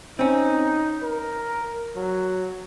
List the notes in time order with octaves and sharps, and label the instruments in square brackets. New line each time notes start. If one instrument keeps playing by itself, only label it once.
[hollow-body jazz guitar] C4 C#4 [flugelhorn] D#4
[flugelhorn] A#4
F#3